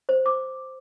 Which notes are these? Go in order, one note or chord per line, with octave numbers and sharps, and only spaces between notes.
C5
D6